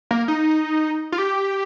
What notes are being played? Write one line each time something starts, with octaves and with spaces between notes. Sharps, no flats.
A#3
D#4
F4
G4